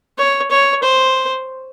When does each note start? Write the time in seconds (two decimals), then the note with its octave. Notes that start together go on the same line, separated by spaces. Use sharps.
0.18 C#5
0.51 C#5
0.83 C5